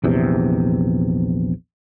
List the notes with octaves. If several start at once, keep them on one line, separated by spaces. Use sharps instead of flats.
A#1 E2 C3